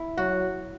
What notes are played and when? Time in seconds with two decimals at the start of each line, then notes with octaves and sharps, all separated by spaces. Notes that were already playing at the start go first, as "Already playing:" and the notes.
Already playing: E4
0.17 F#3 F#4